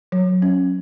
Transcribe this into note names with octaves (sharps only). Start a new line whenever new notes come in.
F#3
C#4